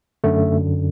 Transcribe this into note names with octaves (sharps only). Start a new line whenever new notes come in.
F#2 D3 A3